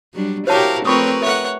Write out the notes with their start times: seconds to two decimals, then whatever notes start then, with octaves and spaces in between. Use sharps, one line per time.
0.14 F#3 G3 D4
0.47 E4 F#4 G4 A#4 C5 C#5 F5 A5
0.85 A3 C4 F4 A#4 B4 C#5 C#6 D#6
1.22 A4 C#5 E5 F#5